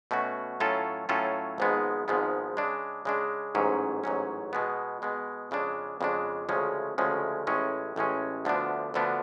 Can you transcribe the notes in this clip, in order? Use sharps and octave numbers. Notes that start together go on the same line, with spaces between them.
B2 A3 C#4 F#4
A2 F#3 C#4 F4 A4
A2 F#3 C#4 F4 A4
G#1 G#2 F3 G#3 B3
G#1 G#2 F3 G#3 B3
C#3 G#3 D4
C#3 G#3 D4
A1 G#2 F#3 C#4
A1 G#2 F#3 C#4
B2 G#3 B3
B2 G#3 B3
F2 C#3 G#3 D4
F2 C#3 G#3 D4
D2 C#3 F3 G#3 C#4
D2 C#3 F3 G#3 C#4
A1 A2 G#3 C#4
A1 A2 G#3 C#4
D2 D3 F3 B3 D4
D2 D3 F3 B3 D4